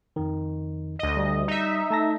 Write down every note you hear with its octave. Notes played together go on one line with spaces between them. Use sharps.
F2 D#3
D2 D#5
G3
D#4 E5
A3 A5 A#6